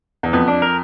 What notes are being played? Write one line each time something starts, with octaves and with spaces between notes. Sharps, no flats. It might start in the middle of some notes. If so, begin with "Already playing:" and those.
E2
F2 B3
D4
A#4